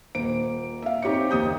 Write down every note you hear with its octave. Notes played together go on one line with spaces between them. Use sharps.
D#1 A#3 C5 D7
E5 F5
C4 D#4 G4 C#5 C#7
F#1 D#2 D#6 G6